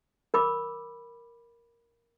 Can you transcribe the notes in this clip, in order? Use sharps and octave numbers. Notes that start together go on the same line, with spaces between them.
A#4 B5 D6